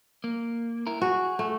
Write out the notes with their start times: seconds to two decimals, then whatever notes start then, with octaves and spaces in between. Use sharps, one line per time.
0.24 A#3
0.87 E4 A#4
1.01 F#4 G#4
1.39 A3